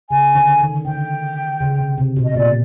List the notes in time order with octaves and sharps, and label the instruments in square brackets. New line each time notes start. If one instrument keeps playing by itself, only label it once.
[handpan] C#3 [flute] G#5
[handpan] D3
D#3
[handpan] D3 [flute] G5
[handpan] C#3
C3
C3
B2
[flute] D#5
[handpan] A#2 [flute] D5